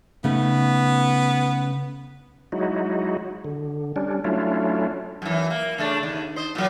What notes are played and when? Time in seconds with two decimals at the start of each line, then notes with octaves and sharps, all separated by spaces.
0.24 C#3 A3 B3 D#4
2.52 F#3 G#3 D#4 E4 F#4
3.45 D3
3.96 G3 C#4 D4
4.24 F#3 A3 C#4 D4 E4 F4
5.22 F#2 E3
5.50 A#3
5.78 C#3 A3 D4
6.03 D#2
6.36 C5 D#5
6.55 A#2 F#3